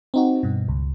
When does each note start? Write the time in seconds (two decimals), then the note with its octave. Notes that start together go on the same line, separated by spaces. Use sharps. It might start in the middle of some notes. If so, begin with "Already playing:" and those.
0.14 C4 D#4 F#4
0.43 G2 B2
0.68 C#2